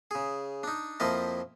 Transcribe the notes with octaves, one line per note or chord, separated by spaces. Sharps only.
C#3 G#4
D4 D#4
F2 F3 A#3 E4 D#5 A5